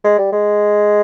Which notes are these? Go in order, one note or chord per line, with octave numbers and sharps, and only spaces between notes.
G#3
G3
G#3